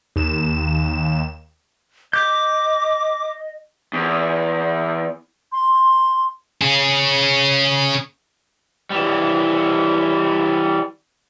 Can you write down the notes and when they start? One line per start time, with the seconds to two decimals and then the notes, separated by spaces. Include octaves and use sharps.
0.16 D#2 E7
2.13 D#5 D6 G6
3.93 E2
5.52 C6
6.61 C#4 G#4
8.90 E3 G3